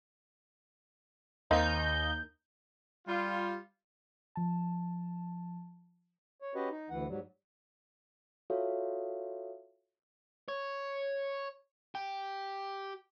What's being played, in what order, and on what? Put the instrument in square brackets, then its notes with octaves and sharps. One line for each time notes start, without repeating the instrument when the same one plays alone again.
[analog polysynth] D#2 D#4 G6 [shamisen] A#3 C4 D#5
[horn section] G3 F4
[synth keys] F3 A5
[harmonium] C#5
C#4 F#4 G4 B4 D#5
D#4
D2 E3 F#5
G#2 F#3 G3
[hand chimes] F4 F#4 A4 C#5 E5 F5
[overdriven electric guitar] C#5
G4